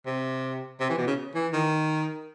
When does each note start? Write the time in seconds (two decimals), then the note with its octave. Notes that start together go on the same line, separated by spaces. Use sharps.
0.06 C3
0.80 C3
0.89 E3
0.98 B2
1.07 C#3
1.35 E3
1.53 D#3